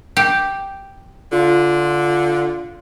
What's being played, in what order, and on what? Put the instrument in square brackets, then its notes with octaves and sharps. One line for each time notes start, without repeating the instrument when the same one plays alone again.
[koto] G4
[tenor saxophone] D3 [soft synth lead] F4